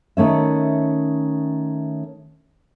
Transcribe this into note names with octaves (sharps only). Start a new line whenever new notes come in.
D#3 A3 C#4 E5